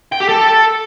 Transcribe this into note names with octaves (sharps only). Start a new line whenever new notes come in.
G5
G4
A4